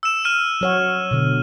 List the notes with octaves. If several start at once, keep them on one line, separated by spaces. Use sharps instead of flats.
E6 E7
F6 D#7
F#3 C#5 F#5
B2 D3